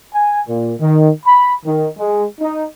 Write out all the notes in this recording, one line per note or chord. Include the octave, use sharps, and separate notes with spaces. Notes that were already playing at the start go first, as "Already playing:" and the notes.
G#5
A#2
D#3
B5
D#3
G#3
D#4